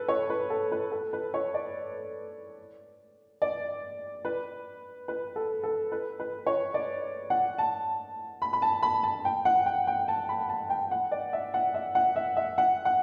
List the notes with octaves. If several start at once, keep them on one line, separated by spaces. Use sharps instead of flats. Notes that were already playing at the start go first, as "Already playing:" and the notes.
Already playing: A4 B4
C#5
B4
A4
B4
A4
B4
C#5
D5
D5
B4
B4
A4
A4
B4
B4
C#5
D5
F#5
A5
B5
B5
A5
B5
A5
G5
F#5
G5
G5
A5
B5
A5
G5
F#5
D5
E5
F#5
E5
F#5
E5
E5
F#5
F#5